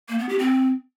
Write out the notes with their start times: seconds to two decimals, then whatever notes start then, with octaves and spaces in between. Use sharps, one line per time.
0.09 A#3
0.19 B3
0.29 G4
0.39 C4